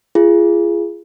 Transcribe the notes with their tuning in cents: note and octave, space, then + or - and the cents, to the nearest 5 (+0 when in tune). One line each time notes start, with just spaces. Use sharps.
F4 -30 G#4 +0